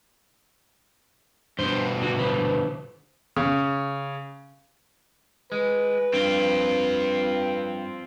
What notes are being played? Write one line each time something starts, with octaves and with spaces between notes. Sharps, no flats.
G2 B2 C5
D3 F#4
D3 B4 C5
C#3
G#3 B4
G2 C4 F4